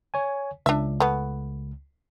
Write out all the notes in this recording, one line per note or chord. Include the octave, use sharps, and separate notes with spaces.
C#5 G#5
C#2 D4 E5
A3 B3